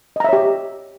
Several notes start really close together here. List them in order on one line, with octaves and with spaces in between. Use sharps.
D#5 A#5 E5 C#5 G4